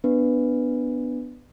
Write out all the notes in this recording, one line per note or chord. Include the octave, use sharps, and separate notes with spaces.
B3 D4 B4